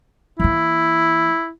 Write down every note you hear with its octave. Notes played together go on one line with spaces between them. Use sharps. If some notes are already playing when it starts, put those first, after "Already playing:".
E3 A#3 E4